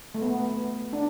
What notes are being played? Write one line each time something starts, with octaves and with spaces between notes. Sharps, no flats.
A3
B3
D4